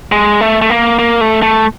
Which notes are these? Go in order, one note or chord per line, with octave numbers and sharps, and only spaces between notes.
G#3
A3
A3
A#3
A#3
A3
A3